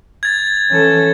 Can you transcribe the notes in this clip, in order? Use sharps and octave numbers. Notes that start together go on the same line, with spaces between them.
G#6 A6
E3 C#4 A4